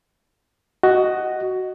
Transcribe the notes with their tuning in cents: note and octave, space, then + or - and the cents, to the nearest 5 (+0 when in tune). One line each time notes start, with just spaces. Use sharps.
F#4 +10 D#5 +0